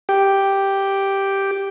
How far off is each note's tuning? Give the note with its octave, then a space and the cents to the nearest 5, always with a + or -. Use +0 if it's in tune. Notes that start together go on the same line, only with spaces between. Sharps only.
G4 +0 G5 +0